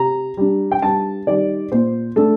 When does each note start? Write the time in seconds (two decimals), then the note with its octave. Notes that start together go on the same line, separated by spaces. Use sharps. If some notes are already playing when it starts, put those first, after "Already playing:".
Already playing: C3 A#5
0.37 G3 D4
0.72 G5
0.82 G2 A5
1.27 D#3 G3 D5
1.72 A#2 C5
2.16 A3 D4 A4